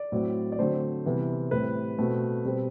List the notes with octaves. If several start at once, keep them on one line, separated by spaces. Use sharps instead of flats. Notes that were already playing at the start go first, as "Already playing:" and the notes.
Already playing: D5
A2 F#3 C4
D5
D3 F#3 A3 C4 C5
C3 E3 G3 B3
A2 G3 C4 B4
B2 A3 C4
B2 G3 C4